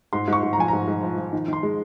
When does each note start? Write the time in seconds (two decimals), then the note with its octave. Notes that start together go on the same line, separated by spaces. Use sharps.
0.13 G#2 C6
0.28 G#2 C#6
0.43 G#2
0.53 A#5
0.58 F3 G#5
0.68 G#2 A#5
0.88 G#2
1.03 F3
1.18 F3
1.33 D#3
1.48 D#3 C6
1.63 G#3